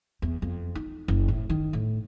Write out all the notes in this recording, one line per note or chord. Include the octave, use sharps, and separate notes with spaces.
E2
F2
D#4
F#1
A2
D#3
A2